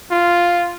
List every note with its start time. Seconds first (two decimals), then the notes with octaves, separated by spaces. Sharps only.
0.11 F4